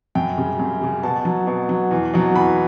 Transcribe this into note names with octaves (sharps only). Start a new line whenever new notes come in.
F#2 G5
C#3 G3
F#2
C#3 G3
B2 A5
F#3
B2
F#3
E2
B2 F#3
E2 B5